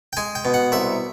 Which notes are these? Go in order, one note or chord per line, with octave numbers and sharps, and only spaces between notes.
G5
G#3 G#5
G5
B2
F#5
C2 E5